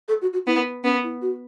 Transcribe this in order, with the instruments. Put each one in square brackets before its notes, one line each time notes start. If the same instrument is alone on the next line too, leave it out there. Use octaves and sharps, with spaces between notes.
[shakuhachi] A4
F#4
F#4
[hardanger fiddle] B3 [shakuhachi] E4
[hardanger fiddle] B3 [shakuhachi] C#4
[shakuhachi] E4
F#4